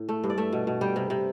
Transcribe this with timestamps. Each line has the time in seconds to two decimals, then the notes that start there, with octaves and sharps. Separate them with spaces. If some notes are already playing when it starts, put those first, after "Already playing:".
Already playing: A2
0.09 A3
0.24 G2
0.30 D5
0.38 A3 E5
0.53 B2
0.67 B2
0.81 G3 G5
0.96 C3
1.10 C3